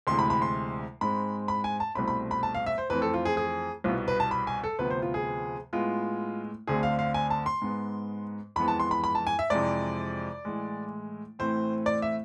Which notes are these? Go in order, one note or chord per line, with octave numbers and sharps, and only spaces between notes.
D2 C3 E3 G#3 C6
B5
B5
C6
G#2 G#3 C4 B5
B5
G#5
A5
C2 B2 A3 C4 B5
B5
B5
A5
F5
E5
C5
F2 E3 A3 C4 B4
A4
F4
G#4
G#4
C2 B2 B3 F4
B4
A5
B5
G#5
A4
D2 C3 F3 B3 B4
C5
F4
G#4
A2 G#3 B3 F4
D2 D3 A3 C4 G#4
F5
F5
G#5
A5
C6
G#2 G#3 B3
F2 E3 G#3 B3 B5
A5
C6
B5
B5
A5
G#5
E5
F2 C3 E3 G#3 D5
A2 E3 G#3
A2 E3 A3 C4 C5
D5
E5